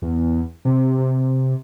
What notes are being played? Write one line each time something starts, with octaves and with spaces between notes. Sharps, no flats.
E2
C3
C3